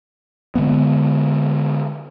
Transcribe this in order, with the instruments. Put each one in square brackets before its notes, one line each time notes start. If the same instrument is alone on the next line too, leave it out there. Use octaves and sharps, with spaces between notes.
[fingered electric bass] D3 D#3 G#3 B3